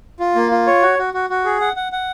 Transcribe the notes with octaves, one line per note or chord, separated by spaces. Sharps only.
F4
A#3
F4
C#5
F#4
F#4
F#4
F#4
G#4
F#5
F#5
F#5